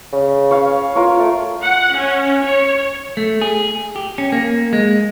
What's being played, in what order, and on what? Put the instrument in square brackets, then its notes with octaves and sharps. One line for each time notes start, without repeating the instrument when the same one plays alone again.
[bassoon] C#3
[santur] C#5 F5
F4 A#4 C#5
[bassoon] A3
[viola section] F#5
C#4
C#5
[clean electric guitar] A3
G#4
G4
C#4
A#3
G#3